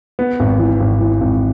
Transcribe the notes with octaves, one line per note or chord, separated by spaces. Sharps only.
B3
G#1
E3
G#1
E3
G#1